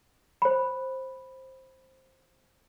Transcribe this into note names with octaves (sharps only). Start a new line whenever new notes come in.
C5 B5